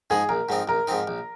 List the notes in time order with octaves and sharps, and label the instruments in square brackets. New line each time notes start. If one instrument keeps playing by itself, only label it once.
[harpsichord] G#2 F3 G#3 D#4 [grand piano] G#4
[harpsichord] A#1 [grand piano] A#4
[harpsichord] G#2 F3 C4 D#4
[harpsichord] A#1 [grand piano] A#4
[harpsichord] G#2 F3 C4 D#4
A#1